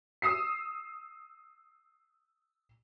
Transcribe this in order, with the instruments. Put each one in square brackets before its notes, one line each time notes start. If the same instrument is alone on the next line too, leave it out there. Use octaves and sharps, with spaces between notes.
[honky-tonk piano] D#6 E6 C7